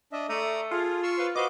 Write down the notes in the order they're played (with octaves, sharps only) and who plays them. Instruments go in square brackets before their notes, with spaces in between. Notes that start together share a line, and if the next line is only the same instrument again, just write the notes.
[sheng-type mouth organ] D4 D#5 E5
[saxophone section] A3 [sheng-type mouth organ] D5 A#5 D#6
[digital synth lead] F4 [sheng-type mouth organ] G#4 A4
[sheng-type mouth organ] C6 C#6 E6
[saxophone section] B4 C5 F5
[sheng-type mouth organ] F#4 B4 F5 [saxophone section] C5 D#5 [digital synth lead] D6